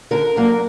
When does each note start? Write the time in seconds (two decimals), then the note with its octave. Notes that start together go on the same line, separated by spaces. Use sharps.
0.11 D3 A#4
0.36 F#3 A#3 D4